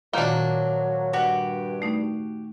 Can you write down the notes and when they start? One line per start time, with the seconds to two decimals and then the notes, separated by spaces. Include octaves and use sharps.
0.13 A#2 D#3 F3 F#3 A#3 D4 F4
1.13 G2 F#4 G4
1.82 A3 D#4